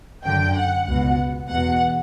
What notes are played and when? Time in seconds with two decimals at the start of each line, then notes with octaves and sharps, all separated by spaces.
0.24 F#2 D3 G5
0.55 F#5
0.86 C#2 B2 F#5
1.49 E2 B2 F#5